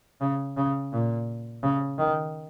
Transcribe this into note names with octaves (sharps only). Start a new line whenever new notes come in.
C#3
C#3
A#2
C#3
D#3